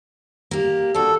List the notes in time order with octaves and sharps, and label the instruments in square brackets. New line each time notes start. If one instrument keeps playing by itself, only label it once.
[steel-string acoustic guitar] A#3 G4
[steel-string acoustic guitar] D4 F#4 [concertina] A4